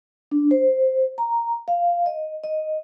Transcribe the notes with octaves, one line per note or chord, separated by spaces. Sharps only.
D4
C5
A#5
F5
D#5
D#5